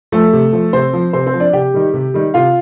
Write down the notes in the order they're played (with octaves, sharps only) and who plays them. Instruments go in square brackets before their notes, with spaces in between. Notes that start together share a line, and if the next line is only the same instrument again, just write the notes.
[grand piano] F3 A3 A4
C3
F3
C3 C4 C5
F3
C3 C4 C5
C4 C5
F3
D4 D5
C3 G4 G5
D#3 G3
C3
D#3 G3
C3 F4 F5